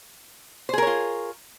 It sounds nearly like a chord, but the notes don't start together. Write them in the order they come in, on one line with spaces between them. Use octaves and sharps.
C5 G#4 A#4 C#5 F4